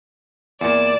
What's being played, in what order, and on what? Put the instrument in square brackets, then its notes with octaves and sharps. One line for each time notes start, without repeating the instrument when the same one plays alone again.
[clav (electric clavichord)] E2 A#2 [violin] D5 E7